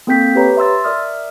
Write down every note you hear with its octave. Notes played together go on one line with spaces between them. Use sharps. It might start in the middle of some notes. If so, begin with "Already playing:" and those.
A#3 C4 A4 G5 G6 B6
G4 B4 C#5 A#5
E5 C6 E6 A6
A#4 D5 E5 D#6 F6